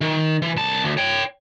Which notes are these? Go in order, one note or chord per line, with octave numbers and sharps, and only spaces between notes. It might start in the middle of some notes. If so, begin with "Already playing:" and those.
D#3
E3
C2 A5
D2
C#5 G5